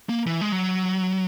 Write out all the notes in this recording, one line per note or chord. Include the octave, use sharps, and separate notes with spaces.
A#3
E3
G#3
F#3